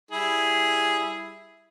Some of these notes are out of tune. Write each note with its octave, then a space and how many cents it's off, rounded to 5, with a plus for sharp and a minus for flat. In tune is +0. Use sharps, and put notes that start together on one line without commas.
G3 +0 E4 +0 G#4 +0